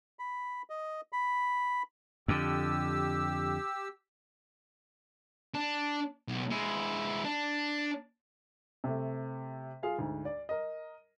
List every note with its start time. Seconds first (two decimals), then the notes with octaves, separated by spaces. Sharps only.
0.19 B5
0.70 D#5
1.13 B5
2.28 F2 D3 G4 E6
5.54 D4
6.28 B1
6.50 G#3 E4
7.24 D4
8.84 C3 A3
9.83 F4 G#4 F5 G#5
9.98 D2 G#2
10.25 D5
10.49 A#4 D#5